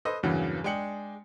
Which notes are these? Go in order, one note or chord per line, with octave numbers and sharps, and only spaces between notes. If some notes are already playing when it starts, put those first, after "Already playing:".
A4 B4 C5 D#5
E2 G2 C#3 E3 F#3 A#3
G#3 D4 G5 C#7 F#7